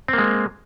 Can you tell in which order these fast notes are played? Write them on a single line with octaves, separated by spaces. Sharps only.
C4 A#3 G#3